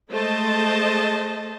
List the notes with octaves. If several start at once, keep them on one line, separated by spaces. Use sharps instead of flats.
G#3 A3 C5 D#5 A5